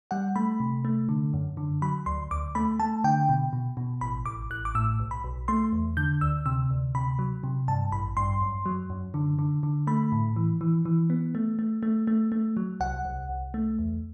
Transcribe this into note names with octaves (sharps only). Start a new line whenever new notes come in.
G3 F#5
A3 B5
C3
A3
D3
F#2
D3
F#3 B5
D2 C6
D2 D6
A3 B5
A3 A5
D3 G5
B2
B2
B2
A1 B5
A1 D6
A1 F#6
D6
A2 E6
B1
B5
B1
A3 C6
E2
D3 G6
D2 E6
C3 E6
D2
C3 B5
F#3
C3
G2 A5
A1 B5
G2 C6
F#2
F#3
F#2
D3
D3
D3
A3 B5
A2
E3
E3
E3
B3
A3
A3
A3
A3
A3
F#3
C2 F#5
C2
C2
A3
E2